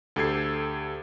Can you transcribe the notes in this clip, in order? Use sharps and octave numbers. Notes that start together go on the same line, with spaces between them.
D2 G4 A4 G#6 C7